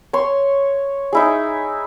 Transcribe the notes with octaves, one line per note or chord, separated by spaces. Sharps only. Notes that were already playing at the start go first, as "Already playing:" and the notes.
C#5 C6
D#4 E4 G#4